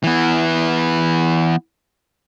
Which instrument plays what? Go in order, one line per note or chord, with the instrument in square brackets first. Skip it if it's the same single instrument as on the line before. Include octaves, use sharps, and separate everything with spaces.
[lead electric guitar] E3 B3